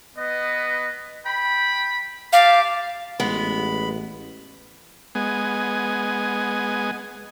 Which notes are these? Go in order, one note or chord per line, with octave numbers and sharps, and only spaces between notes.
B3 B4 D#5
G5 B5
G4 F5 A5 D6
A1 G#3 B3 B5
G#3 B3 G#5